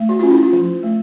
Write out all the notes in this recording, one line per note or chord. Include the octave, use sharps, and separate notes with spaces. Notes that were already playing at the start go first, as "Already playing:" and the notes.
Already playing: A3
F#4
C#4 F4
E4
F4
F3
A3